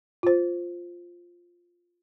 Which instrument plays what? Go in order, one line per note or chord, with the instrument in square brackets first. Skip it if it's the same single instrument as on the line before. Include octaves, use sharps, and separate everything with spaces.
[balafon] F4 C5